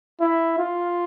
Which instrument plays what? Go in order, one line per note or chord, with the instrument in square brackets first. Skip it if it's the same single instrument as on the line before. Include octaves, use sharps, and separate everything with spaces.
[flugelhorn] E4
F4